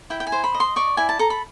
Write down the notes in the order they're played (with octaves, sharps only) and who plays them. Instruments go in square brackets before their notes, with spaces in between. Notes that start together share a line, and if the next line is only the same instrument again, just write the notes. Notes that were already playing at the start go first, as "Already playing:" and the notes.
[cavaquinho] E4 G5
G5
G#5
C5
B5
D#5
C6
D5 C#6
E4 G#5
A5
A4 A#5
B5